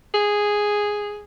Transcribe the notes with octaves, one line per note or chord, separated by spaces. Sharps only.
G#4